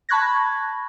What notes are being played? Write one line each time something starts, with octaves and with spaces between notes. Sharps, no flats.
A5 B5 C#6 F#6 G#6 A#6